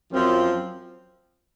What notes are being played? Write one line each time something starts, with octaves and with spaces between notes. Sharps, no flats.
F#2 F3 C4